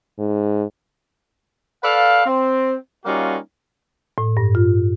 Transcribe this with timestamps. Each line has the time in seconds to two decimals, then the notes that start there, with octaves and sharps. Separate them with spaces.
0.19 G#2
1.84 A4 B4 D5 F5
2.26 C4
3.05 G3 A#3 C#4 D#4 F4 F#4
4.18 A2
4.37 G2
4.55 F4